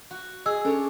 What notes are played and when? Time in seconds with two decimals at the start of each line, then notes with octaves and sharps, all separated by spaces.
0.11 F#4
0.46 G#4 D#5 E6
0.65 C#4 D4 A4 C#5